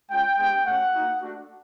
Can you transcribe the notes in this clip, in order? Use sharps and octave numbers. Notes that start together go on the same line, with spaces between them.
G#3 C#4 F4 G5
G#3 B3 D4 G4 G5
A3 C#4 F#4 F#5
A#3 D#4 F#4
A3 D4 F#4